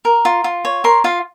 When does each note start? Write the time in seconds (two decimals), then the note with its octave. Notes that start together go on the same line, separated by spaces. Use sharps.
0.05 A#4
0.25 F4
0.44 F4
0.65 C#5
0.84 A#4 C6
1.04 F4 F5